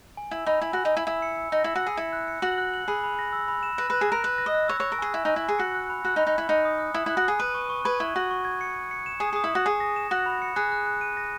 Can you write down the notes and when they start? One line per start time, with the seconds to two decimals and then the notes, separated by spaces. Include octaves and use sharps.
0.17 G#5
0.31 E4 E6
0.46 D#4 B5
0.61 E4 G#5
0.73 F#4 G#5
0.85 D#4
0.92 E4 G#5
1.07 E4 E6
1.22 C#7
1.37 E6
1.52 D#4 A#6
1.64 E4 E6
1.75 F#4
1.82 G#4 C#7
1.97 E4 C#7
2.13 F#6
2.28 C#7
2.42 F#4 F#7
2.58 F#6
2.74 F#7
2.88 G#4 B5
3.04 B5
3.19 A#6
3.33 E6
3.48 B5
3.63 E7
3.78 B4 A#6
3.90 B4 F#6
4.01 G#4
4.08 A#4 F#6
4.24 B4 F#6
4.38 A#6
4.46 D#5
4.54 F#6
4.68 C#5 E6
4.80 C#5 C#6
4.92 A#4
4.99 G#4 G#5
5.13 E4 G#5
5.25 D#4 G#5
5.36 E4
5.44 G#4 G#5
5.59 F#4 C#7
5.75 F#6
5.90 B5
6.05 F#4 F#6
6.16 D#4
6.19 B5
6.27 D#4
6.34 E4 B5
6.49 D#4 C#7
6.65 D#6
6.79 F#6
6.94 E4 D#6
7.06 E4 F#6
7.17 F#4
7.24 G#4 D#6
7.39 B4 D#7
7.54 C#6
7.69 C#6
7.85 B4 G#6
8.00 E4 C#6
8.15 F#4 C#6
8.31 C#6
8.45 G#6
8.61 C#7
8.75 C#7
8.91 C#7
9.06 E7
9.20 G#4 D#6
9.33 G#4 D#6
9.44 E4
9.50 F#4 D#6
9.65 G#4 D#6
9.80 A#6
9.96 E7
10.11 F#4 F#6
10.26 B5
10.42 C#7
10.56 G#4 F#6
10.72 F#6
10.87 F#6
11.01 D#7
11.17 A#6